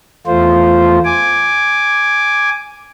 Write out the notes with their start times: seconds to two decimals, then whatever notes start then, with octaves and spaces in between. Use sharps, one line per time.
0.27 E2 A3 F4 C5
1.05 G#5 D6